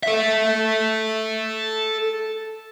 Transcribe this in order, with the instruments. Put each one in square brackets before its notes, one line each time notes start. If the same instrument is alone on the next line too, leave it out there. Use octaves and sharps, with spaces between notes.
[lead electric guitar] A4 E5